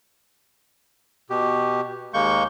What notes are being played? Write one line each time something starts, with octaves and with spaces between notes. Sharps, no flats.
B2 G4
D#2 G#3 A#3 C#6 G6